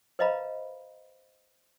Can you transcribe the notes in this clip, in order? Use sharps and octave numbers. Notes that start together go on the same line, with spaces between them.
B4 C5 D#5 F5 A#5 B5